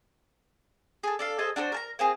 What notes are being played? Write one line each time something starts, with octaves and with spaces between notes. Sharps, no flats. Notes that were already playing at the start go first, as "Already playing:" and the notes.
G#4 A4
D4 A4 F5
G#4 A4 C5 D#5
D4 F#4 A#4 C5
A#4 A5 A#5
A#3 C4 G#4